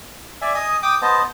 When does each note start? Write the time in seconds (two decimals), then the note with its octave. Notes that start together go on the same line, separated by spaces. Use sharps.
0.42 D5 E5 G#5
0.54 D#5 G#5 D#6
0.83 G5 D6 D#6
1.02 B3 C5 D#5 A5